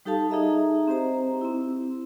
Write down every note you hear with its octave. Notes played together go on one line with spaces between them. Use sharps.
G3 D#4 G4 A4 F5 A5
D#4 G#4 D#5 E5 A#5
C4 G4 C5 A#5
C4 E4